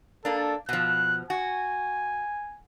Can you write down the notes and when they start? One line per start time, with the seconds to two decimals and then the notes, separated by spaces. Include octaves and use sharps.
0.25 A#3 D4 A4
0.69 B2 F3 F#6
1.30 F#4 G#5